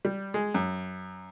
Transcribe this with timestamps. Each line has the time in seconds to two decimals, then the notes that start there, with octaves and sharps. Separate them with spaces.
0.05 G3
0.34 G#3
0.54 F#2